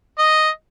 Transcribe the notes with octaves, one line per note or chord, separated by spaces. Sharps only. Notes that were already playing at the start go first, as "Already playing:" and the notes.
D#5